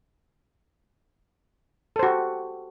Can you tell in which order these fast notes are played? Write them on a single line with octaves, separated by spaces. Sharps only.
A4 C5 F#4 G4